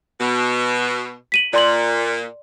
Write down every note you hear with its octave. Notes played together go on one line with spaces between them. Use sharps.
B2
B6 D#7 F#7
A#2 D5 C6 F#7